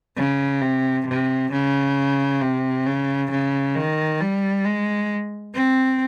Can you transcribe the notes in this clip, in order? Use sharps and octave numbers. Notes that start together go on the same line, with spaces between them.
C#3
C3
C3
C#3
C3
C#3
C#3
D#3
G3
G#3
C4